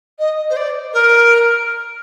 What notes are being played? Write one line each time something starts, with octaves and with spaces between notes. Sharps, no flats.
D#5
C5
D5
A#4